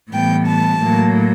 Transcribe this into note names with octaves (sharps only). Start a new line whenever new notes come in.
A2 E3 G3 B3 G5
A5
A2 F#3 A#3